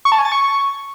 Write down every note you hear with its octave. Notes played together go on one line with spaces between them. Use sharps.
C#6
A5
G#5
A6
C#6